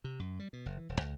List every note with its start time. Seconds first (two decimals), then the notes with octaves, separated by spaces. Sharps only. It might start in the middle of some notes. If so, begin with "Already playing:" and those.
0.04 C3
0.19 F#2
0.39 G3
0.53 B2
0.66 F#1
0.78 E3
0.89 D#1
1.01 C#2